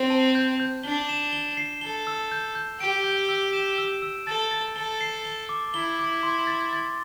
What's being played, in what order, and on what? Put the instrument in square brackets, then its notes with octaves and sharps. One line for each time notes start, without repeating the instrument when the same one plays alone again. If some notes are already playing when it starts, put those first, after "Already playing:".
Already playing: [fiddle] C4
[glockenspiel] A5
G6
G6
[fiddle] D4 [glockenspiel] G7
[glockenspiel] E7
G7
C7
[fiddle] A4 [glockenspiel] G7
[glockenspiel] E6
G6
G6
[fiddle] G4 [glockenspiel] D7
[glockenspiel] G6
E6
E7
E6
E6
[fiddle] A4 [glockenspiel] A6
[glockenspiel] A6
[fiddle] A4 [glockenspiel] G7
[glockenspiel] C7
G7
D6
[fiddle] E4 [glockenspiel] G7
[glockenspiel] D6
C6
A6
A6